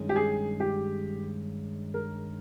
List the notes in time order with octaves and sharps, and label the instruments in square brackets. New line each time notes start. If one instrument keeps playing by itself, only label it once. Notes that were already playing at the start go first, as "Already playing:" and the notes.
Already playing: [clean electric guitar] G2 D#3 G#3 C#4
[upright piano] G4
G#4
G4
A#4